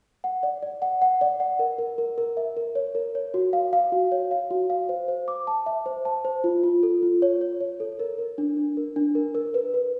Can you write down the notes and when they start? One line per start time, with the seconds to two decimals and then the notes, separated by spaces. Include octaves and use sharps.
0.24 F#5
0.43 D5
0.62 D5
0.82 F#5
1.02 F#5
1.21 D5
1.40 F#5
1.59 A#4
1.78 A#4
1.98 A#4
2.18 A#4
2.37 E5
2.57 A#4
2.75 C#5
2.95 A#4
3.15 C#5
3.34 F#4
3.53 F5
3.73 F5
3.92 F#4
4.12 C#5
4.31 F5
4.51 F#4
4.70 F5
4.89 C5
5.08 C5
5.28 D6
5.47 A5
5.66 E5
5.86 C5
6.05 A5
6.25 C5
6.44 F4
6.63 F4
6.83 A4
7.02 F4
7.22 C#5
7.41 C#5
7.60 C#5
7.80 A4
8.00 A#4
8.18 A#4
8.38 D4
8.57 D4
8.77 A#4
8.96 D4
9.15 A#4
9.35 A#4
9.54 B4
9.74 B4